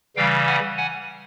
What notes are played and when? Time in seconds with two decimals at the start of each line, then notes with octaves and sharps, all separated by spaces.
0.17 C#3 E3 G3 F5 G5
0.47 F#5 G#5
0.77 F#5 G#5